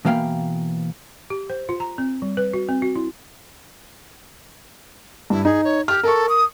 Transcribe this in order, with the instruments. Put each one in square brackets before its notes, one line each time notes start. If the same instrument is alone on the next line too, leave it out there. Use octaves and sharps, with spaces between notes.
[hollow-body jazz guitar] B2 E3 A#3 F5 G5 B5
[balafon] G4
C5
F4
A#5
C4
G3
B4
F#4
C4
F#4
E4
[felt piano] G2 [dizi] E4
[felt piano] D#4 [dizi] G#4
[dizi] C#5
[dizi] G4 [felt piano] F6
[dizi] A4 [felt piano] A#4 C#6
[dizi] D#6